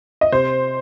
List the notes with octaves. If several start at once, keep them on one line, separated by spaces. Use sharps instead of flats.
D#5
C3 C5